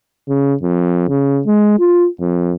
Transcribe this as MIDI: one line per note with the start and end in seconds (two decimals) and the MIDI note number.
0.29 0.54 49
0.63 1.04 41
1.09 1.41 49
1.46 1.76 56
1.80 2.08 65
2.21 2.54 41